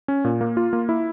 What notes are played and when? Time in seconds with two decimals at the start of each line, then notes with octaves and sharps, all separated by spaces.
0.08 C#4
0.24 A#2
0.41 A#3
0.57 F4
0.73 A#3
0.89 E4